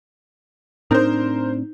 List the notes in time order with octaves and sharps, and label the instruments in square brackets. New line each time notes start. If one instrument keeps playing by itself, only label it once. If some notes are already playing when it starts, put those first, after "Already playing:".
[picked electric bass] A2 C4 D4 [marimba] D#4 G6 [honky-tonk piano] A#4 C5